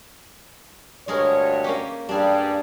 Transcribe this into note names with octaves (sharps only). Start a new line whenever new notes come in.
D2 G2 G#3 G#4 A#4 C#5
A#3 C#4 G4
G2 G3 D4 G#4